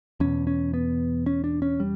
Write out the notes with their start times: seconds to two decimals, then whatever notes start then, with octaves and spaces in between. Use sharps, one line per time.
0.20 E2 B2 C#4
0.47 C#4
0.74 B3
1.26 C#4
1.44 D4
1.62 C#4
1.80 G3